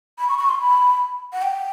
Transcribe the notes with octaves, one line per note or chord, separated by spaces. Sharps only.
B5
C#6
C#6
C6
B5
F#5
G5